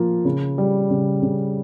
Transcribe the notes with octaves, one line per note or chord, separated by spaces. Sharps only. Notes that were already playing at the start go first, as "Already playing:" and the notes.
Already playing: F3 A#3 F4
C#3
G3
C#3
C#3